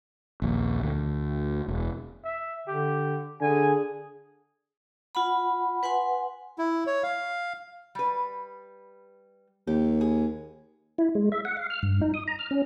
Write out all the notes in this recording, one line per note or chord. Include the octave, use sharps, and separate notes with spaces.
A#1 D#2
D2
E1
E5
D3 G4
D3 G#4 G#5
F4 F#5 B5
B4 F#5 G#5 C6
E4
C#5
F5
G3 B4
D#2 G4
G#4
E4
G#3
E5
F#5
F5
F6
G2
D#4
D#6
A#5
F6
C#4